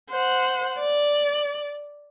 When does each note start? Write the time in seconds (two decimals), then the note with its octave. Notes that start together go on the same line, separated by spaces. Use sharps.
0.11 C5 F#5
0.79 D5